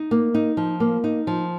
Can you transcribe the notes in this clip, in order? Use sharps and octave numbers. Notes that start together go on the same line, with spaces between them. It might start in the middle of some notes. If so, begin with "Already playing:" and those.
Already playing: D#4
A#3
D#4
F3
A#3
D#4
F3